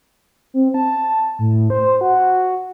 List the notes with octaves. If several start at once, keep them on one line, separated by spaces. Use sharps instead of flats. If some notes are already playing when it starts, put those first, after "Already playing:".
C4
A5
A2
C5
F#4